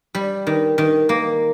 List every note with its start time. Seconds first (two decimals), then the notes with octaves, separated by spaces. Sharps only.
0.15 G3
0.47 D#3
0.78 D#3
1.09 A#3